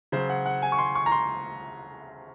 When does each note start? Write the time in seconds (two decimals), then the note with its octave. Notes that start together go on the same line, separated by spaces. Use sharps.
0.12 C#3 F#3 C5
0.30 F#5
0.46 F#5
0.62 G#5
0.72 C#6
0.79 C6
0.95 C#6
1.06 A#5
1.12 C6